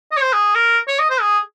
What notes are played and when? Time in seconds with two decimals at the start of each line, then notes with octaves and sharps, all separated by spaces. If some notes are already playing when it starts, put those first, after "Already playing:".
0.12 D#5
0.17 C#5
0.22 C5
0.33 G#4
0.55 A#4
0.88 C#5
0.99 D#5
1.10 C5
1.21 G#4